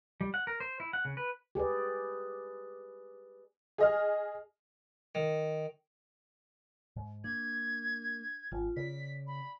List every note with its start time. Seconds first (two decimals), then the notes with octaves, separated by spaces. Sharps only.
0.21 G3
0.34 F#5
0.47 A#4
0.60 C5
0.80 E4
0.93 F#5
1.05 C#3
1.17 B4
1.55 G4 G#4 B4 D5
3.78 G#4 D#5 F6
5.15 D#3
6.96 G#2
7.24 A#3 D4 G#6
8.52 G#1 F4
8.77 C#3 D5 B6
9.27 B5